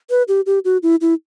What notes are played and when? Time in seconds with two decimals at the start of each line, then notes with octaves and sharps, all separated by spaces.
0.10 B4
0.28 G4
0.46 G4
0.65 F#4
0.83 E4
1.01 E4